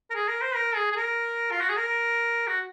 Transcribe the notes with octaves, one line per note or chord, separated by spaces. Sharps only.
A#4
G#4
A#4
C5
A#4
G#4
G#4
A#4
F4
F#4
G#4
A#4
F#4